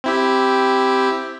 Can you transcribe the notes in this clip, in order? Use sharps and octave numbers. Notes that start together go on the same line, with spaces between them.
C4 E4 G4